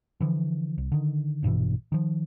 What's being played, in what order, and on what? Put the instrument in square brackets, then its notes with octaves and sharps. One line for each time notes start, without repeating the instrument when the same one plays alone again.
[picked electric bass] D3 E3 F3
C2
D3 D#3
A#1 G2 B2 E3
D#3 F3